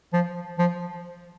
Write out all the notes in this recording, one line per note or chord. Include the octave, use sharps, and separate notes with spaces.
F3
F3